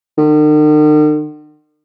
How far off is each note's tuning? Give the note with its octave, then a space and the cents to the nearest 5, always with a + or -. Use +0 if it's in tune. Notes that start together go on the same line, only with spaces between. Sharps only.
D#3 -45